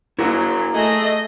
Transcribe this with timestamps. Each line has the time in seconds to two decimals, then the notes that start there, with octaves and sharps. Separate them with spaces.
0.19 F#2 C#3 F#3 E4 F#4 A#4
0.74 A3 G#4 D#5 A#6